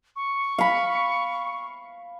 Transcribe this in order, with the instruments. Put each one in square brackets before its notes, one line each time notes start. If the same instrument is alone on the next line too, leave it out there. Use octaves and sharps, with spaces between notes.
[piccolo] C#6
[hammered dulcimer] F5 B5